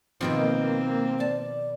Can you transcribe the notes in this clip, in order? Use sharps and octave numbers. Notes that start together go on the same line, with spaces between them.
B2 D#3 F3 A#3 C4
D5 A5